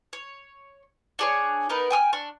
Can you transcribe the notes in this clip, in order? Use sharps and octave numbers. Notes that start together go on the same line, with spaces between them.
C#5
D4 G#4 C#5
B3 D#4 A#4 B4
G5 G#5 E6 F6
D4 C#6